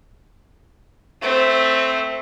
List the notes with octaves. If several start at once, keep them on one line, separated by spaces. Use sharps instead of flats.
A3 C4